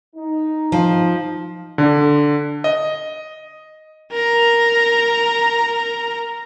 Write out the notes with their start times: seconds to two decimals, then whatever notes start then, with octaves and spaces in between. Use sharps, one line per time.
0.16 D#4
0.72 F3
1.78 D3
2.64 D#5
4.12 A#4 A#5